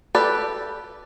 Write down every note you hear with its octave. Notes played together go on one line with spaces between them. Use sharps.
G4 A4 B4 D5